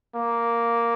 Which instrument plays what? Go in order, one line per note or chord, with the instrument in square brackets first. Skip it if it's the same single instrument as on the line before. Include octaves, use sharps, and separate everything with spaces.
[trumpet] A#3